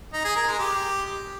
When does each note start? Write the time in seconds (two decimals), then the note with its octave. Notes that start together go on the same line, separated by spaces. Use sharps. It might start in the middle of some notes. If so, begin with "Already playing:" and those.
0.13 D#4
0.25 G#4
0.36 A#4
0.47 G#3
0.59 G4